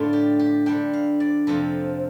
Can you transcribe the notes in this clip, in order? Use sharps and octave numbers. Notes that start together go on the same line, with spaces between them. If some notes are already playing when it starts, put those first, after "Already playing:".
Already playing: A2 D3 A3 D4 F4 A4
G4
G4
D3 G3 D4 G5
F5
D5
F2 C3 F3 C4 A4